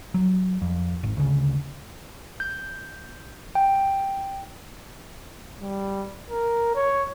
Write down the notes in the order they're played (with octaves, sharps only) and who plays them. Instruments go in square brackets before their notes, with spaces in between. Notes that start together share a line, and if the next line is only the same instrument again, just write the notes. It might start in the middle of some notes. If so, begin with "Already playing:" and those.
[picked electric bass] F#3
F2
G#1
D2 C#3
[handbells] G6
G5
[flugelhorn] G3
A#4
C#5